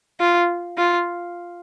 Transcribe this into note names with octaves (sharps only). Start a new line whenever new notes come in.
F4
F4